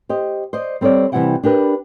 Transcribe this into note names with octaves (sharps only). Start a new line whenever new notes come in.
G4 C5 D#5
C5 D5 D#5
G3 C4 A4 C#5 D5
C3 E3 G3 E4 F#5 G5
D4 G4 A#4 B4